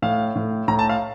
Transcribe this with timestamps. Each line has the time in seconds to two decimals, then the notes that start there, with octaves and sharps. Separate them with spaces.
0.02 A2 F5
0.36 A2
0.68 A2 A#5
0.79 A5
0.89 F5